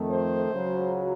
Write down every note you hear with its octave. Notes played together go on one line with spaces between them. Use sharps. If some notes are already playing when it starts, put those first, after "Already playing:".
Already playing: F2 D#3 A3
C5
C#2 C#3 F#3